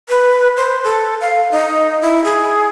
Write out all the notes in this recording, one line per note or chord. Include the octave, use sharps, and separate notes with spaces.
B4
C5
A4
F5
D#4
E4
G#4